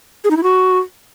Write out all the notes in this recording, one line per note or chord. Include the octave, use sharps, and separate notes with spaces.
G#4
D#4
E4
F#4